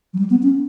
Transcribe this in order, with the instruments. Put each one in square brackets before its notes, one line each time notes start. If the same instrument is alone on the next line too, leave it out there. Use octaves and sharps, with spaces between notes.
[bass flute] F#3
G3
B3
C#4